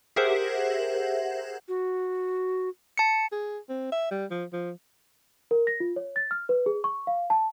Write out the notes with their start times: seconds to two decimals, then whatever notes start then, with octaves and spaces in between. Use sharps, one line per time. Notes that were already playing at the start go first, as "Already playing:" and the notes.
0.16 G4 G#4 A#4 C5 E5 F#5
1.68 F#4
2.98 A5 C#7
3.32 G#4
3.69 C4
3.92 E5
4.11 G3
4.31 F3
4.53 F3
5.51 A#4
5.67 A#6
5.80 F4
5.96 C#5
6.16 A6
6.31 F6
6.49 B4
6.66 G#4
6.84 C#6
7.07 F5
7.30 A5